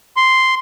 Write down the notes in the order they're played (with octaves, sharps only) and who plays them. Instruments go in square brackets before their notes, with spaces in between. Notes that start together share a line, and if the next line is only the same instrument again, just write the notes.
[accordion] C6